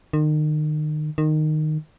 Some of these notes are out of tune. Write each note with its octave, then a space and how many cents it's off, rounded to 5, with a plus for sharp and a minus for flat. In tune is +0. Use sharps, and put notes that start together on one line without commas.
D#3 -35
D#3 -15